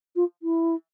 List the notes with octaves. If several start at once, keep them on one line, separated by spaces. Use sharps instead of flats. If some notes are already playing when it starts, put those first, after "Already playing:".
F4
E4